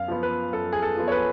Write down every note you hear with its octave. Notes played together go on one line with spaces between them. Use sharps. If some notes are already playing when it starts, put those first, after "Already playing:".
Already playing: F#2 F5
F3 B3
B4
F#2 A4
G#4
A4
F3 B3
C#5
B4